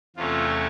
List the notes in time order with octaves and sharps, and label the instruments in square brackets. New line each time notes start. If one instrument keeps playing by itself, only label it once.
[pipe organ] E2 C3 E3 A3 C#4 F4